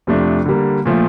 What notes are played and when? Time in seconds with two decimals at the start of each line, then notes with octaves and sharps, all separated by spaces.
0.07 F2 C3 F3 A3 D4
0.46 D3 G3 A#3
0.86 A#2 F3 A3